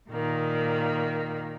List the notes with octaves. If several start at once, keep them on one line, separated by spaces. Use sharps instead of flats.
A#2 D#3 A#3